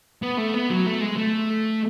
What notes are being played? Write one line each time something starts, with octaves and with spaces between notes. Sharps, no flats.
B3
A3
B3
F#3
A3
G#3
A3